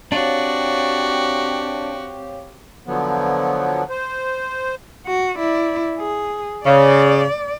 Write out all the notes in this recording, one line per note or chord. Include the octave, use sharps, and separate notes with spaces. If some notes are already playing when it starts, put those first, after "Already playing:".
C4 D4 F#4 G4 C#5 F5
D3 F3 F#3 B3
C5
F#4
E4 D5
G#4
C#3 D5